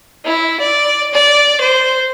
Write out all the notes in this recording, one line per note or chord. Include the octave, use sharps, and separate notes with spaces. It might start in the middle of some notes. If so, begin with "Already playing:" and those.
E4
D5
D5
C5